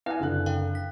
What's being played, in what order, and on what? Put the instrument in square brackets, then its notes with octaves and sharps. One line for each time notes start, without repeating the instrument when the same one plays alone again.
[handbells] C4 E4 B4 [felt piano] F5 F#5 G#5
[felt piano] F#1 D3 F#6
[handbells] A#4 F5 G5
B6